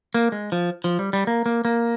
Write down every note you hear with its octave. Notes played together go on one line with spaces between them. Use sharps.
A#3
G#3
F3
F3
G3
G3
A#3
A#3
A#3